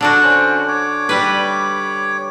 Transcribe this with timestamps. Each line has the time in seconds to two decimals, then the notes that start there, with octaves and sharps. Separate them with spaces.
0.01 D3 D4 F#4 A4
0.23 C#4 C5
0.68 C#5 D6
1.09 G3 B4